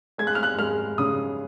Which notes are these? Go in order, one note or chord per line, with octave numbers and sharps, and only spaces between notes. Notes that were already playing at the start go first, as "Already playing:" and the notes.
G#3 G#6
F#6
F6
F#6
G#3 F6
C#3 D#6